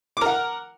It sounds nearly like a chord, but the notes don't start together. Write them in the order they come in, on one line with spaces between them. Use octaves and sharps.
D6 A#4 F#5